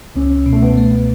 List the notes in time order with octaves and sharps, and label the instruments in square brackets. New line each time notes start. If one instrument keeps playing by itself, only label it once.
[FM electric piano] C#2 [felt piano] C#4
[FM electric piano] B2
[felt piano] A3
B3
[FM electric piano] A3